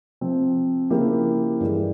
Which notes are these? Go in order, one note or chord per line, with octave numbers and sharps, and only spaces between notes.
C3 F3 C4
C#3 F3 A#3 E4 G4
G2 E3 G#3